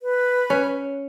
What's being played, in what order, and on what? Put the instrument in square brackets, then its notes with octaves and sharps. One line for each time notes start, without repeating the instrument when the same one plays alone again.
[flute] B4
[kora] C#4